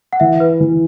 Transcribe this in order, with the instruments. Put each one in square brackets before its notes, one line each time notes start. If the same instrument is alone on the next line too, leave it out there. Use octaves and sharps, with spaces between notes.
[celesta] F#5
[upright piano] E3 [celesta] E5
[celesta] B4
[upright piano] E3